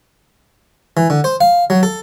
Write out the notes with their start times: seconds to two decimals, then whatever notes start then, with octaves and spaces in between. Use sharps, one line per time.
0.97 E3
1.10 D3
1.24 C5
1.41 F5
1.70 F#3
1.83 A4